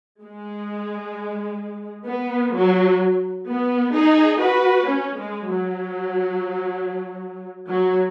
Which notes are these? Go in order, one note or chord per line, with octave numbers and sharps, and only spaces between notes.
G#3
B3
F#3
B3
D#4 G#4
F#4 B4
C#4
G#3
F#3
F#3